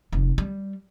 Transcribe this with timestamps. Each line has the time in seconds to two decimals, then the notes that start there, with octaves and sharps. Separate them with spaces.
0.12 F1
0.38 G3